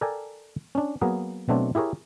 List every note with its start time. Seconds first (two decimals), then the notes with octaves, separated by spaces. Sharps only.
0.01 A4 A#4 D5 G5 G#5
0.75 C#4 D4
1.01 F#3 A#3 B3 G#4 A#4
1.49 B2 F#3 A3 C4 D4
1.75 E4 G4 G#4 A#4 C#5